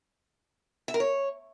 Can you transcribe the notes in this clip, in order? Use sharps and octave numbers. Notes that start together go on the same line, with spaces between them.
E5
A#4
C#5